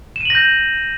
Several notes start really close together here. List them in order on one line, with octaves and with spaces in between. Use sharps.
E7 D#7 F#7 A#6 G6